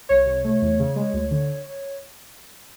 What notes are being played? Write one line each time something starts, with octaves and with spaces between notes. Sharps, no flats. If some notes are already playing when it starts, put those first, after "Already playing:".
C2 C#5
C3
A3
E2
C#3
G#3
D2
D3